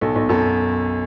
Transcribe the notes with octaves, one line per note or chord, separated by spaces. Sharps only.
B1 A4
B1
F#2 A4